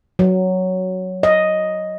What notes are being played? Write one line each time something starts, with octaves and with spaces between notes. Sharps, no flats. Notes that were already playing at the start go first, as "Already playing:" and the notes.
F#3
D#5